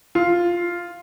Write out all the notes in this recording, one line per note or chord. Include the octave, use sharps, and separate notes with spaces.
F4